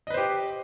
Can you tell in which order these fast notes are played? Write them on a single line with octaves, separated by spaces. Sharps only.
D#5 B4 C5 G4